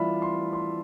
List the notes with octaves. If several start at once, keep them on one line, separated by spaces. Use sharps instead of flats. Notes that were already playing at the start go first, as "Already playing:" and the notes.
Already playing: E3 G3 D4 F4 E5 F5 B5
C6
C6